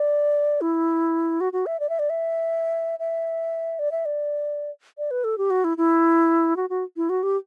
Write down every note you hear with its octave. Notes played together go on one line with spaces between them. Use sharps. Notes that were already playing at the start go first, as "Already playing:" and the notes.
Already playing: D5
E4
F#4
F#4
E5
D5
E5
D5
E5
E5
D5
E5
D5
D5
B4
A4
G4
F#4
E4
E4
F#4
F#4
E4
F#4
G4